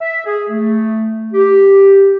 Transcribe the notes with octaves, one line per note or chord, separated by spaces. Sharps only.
E5
G#4
A3
G4